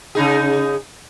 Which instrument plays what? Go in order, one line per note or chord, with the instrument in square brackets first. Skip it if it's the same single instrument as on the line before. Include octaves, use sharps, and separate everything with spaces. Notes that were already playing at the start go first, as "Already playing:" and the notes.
[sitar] C#3 D#4 G#4